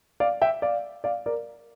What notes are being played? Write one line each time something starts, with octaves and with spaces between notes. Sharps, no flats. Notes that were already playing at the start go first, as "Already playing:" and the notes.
D5 F5
E5 G5
D5 F5
D5 F5
A#4 D5